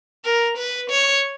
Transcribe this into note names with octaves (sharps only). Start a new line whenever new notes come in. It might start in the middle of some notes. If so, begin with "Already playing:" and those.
A#4
B4
C#5